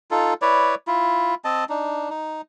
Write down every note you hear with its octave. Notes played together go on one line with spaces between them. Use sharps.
D#4 F4 A4
E4 B4 C#5 D5
E4 F4
C4 D#5 A5
D4 D#4
D#4